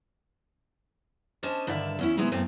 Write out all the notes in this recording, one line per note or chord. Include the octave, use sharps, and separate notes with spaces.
C#4 D4 C5 D#5 A5
G2 D3 D#3 D5 E5
E2 C#4 E4
C3 G#3 B3 D#4 E4
F#2 A#2 A3 C4